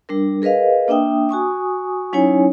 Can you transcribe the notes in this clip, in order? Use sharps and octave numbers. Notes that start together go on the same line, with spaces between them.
G3 D4 A#4
G#4 A#4 B4 D#5 F5
A#3 D4 E5 G5 D#6
F#4 G#5 C#6 D#6
F#3 C#4 D#4 E4 C#5 G#5